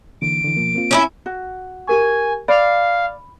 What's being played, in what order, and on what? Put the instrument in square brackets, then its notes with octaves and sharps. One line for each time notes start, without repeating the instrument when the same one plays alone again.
[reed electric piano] D3 E3 A#3 [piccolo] D7
[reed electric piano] D3 E3
B2 F3 A#3
A#3 C4 F4
[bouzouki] C#4 D#4 E4
[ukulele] F#4
[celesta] G4 A#4 C#6 [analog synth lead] G#5
[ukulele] D5 [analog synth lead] F5 [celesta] B5